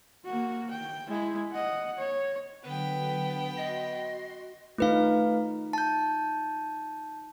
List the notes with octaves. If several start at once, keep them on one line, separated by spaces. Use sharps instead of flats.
A#3 F#4
G5
G#3 E4
D#5 F#5
C#5
D3 F#3 B3 B4 G5
F#4 D#5 C6
A3 D#4 F4 B4 F5
A5 G6